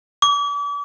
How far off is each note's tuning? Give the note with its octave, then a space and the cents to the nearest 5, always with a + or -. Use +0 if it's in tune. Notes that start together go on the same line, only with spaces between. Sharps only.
D6 -40